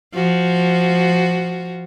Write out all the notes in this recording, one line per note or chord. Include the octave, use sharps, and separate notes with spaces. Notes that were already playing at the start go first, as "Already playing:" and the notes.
F3 F#4